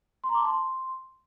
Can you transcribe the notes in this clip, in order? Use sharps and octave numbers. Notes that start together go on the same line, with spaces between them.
C6
A#5
D6
A5
C6